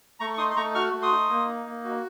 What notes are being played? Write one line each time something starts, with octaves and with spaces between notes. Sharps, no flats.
A3 A#5 C#6
C#6
D#4 C6 D#6
C6
A3 A#5 C#6
F#4 C#6 F6
A3
C6 D#6
D#4
A#3
D#4
A#3
F#4